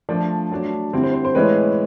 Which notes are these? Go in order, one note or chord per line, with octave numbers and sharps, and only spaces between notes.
F3 A3 D4 D5
F#3 A3 D4
D3 G3 C4 E4
C5
C5
C5
A2 E3 G#3 C#4 E4 B4